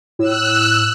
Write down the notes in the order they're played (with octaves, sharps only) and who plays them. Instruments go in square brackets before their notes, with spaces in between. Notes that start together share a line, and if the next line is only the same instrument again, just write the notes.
[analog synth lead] A2 [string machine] E6 F#6